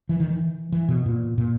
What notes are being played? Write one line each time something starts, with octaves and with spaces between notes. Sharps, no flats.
E3
D#3
E3
E3
B2
A#2
A#2